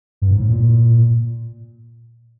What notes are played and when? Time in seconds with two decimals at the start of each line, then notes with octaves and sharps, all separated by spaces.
0.22 G2
0.31 G#2
0.40 A2
0.50 A#2